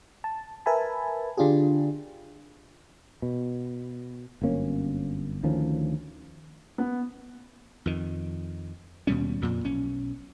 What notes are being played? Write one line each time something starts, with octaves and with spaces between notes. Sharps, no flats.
A5
A#4 B4 E5 G#5 A5 B5
D3 D4 F4 G4 G#4
B2
G1 F#2 A#3 C#4
D2 D#3 F3 C#4
B3
F2 D#3
D#2 B2 G3 C#4
A1 F2 A#2
B1 C#4